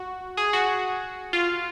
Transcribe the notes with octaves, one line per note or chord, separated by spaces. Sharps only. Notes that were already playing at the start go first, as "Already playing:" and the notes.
Already playing: F#4
G#4
F#4
F4